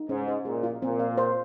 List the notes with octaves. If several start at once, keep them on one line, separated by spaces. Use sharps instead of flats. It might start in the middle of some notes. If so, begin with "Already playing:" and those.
Already playing: D#4
G#2 C#4
C5
A#2 G#4
F4
A#2 C4
F5
C5